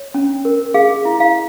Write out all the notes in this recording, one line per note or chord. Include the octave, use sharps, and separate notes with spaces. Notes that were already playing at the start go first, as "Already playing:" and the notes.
Already playing: C#5
C#4
A#4
G#4 F5
E4
F5